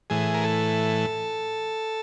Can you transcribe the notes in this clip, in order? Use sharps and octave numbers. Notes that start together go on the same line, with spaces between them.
A2 E3 G#4
A#4
A4